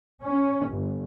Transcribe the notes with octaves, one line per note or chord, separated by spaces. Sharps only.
C#4
G1